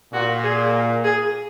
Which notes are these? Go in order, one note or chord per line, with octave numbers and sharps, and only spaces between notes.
A#2 F#4
G#4
G#4